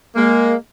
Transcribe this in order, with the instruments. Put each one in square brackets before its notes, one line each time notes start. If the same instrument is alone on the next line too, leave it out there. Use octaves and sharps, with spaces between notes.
[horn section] G#3 A#3